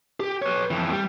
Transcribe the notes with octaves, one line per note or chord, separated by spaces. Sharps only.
G4
B4 C#5
F2 E3
G3